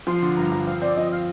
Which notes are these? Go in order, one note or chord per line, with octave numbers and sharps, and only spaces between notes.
F3 C6
D3
G2 A#5
F3
C4 F5
C4 D5
F3 D#5
F5